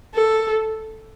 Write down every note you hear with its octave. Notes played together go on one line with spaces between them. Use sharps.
A4